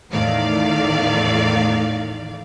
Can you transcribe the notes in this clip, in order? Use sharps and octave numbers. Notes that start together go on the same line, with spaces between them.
E2 A2 D#3 A3 D5 F5